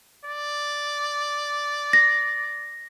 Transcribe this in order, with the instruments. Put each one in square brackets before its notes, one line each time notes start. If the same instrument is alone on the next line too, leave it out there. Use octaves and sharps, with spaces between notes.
[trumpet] D5
[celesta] A#6